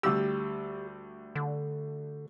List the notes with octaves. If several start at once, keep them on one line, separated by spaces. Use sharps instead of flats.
D2 G3 G4 E6
D3